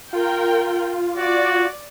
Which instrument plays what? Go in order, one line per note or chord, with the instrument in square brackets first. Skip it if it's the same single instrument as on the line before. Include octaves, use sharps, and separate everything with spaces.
[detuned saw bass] F4 [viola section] A#4 G5
[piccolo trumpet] F#4 [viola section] D5